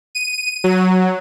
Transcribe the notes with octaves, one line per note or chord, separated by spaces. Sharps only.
D#7
F#3